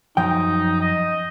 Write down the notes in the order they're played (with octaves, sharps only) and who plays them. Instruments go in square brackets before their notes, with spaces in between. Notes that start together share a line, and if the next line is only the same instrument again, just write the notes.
[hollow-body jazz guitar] F#2 F3 G5 [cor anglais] D#4
[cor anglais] D#5